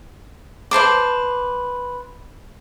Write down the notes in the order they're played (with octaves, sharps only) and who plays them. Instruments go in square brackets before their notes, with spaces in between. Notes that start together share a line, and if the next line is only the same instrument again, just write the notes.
[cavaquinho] B4 C5 A5 D6